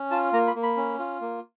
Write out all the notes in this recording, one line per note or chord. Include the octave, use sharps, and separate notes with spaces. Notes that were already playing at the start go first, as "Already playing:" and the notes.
Already playing: C#4
F4 A5
A#3 A#5
B5
A#3
B5
C#4
F4
A#3